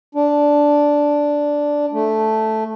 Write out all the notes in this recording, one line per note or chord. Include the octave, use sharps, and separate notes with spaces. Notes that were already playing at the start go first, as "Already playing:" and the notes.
D4
A3